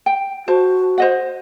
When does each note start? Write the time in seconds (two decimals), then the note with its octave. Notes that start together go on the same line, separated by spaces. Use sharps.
0.06 G5
0.48 F#4 C5 A5
0.98 C5 D#5 F#5